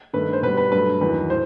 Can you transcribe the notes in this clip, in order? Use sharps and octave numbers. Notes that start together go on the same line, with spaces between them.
G2 D#3 A3 B4
C5
B2 G3 B4
B4
G2 F#3 A3 B4
E2 D#3 F#3 B4
A2 C5